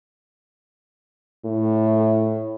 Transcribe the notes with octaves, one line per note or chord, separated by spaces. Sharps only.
A2